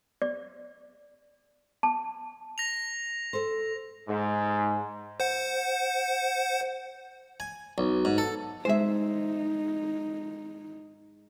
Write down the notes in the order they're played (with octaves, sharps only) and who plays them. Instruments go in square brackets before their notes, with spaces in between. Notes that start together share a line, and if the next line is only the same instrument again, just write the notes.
[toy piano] D5
A5
[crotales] A#6 F7
[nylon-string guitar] A4 C5
[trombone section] G#2
[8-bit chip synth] C5 F#5
[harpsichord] G#5
B1
G#2
A4
[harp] G#2 G#3 [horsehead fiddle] D#4 [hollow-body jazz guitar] C5 E5